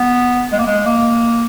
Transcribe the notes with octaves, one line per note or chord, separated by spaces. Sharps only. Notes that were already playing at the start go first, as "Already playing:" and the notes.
Already playing: B3
G#3
A#3
G#3
A#3